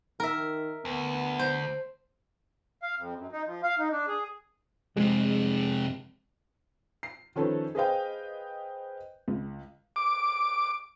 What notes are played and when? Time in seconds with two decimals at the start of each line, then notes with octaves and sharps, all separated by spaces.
0.20 D#3 A#4 E5
0.85 D2 B3
1.39 C5
2.82 F5
2.97 F2
3.17 F#2
3.32 D#4
3.46 F3
3.63 F5
3.79 D#4
3.91 D4
4.07 G#4
4.97 F2 C3 G#3 G#4
7.03 C7
7.36 D#3 F3 C#4 A4 B4
7.75 G#4 B4 C5 D#5 F5 G5
9.28 C#2
9.96 D6